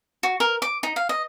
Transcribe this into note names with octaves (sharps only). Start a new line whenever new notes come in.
F#4
A#4
D6
D#4
F5
D#5